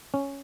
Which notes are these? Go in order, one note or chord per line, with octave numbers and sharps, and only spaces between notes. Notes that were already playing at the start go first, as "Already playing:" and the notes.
C#4